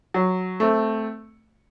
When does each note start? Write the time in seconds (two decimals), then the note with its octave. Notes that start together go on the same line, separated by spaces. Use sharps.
0.14 F#3
0.60 A3 C4